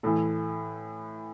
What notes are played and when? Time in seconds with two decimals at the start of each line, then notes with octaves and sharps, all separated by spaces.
0.03 A2 E3 A4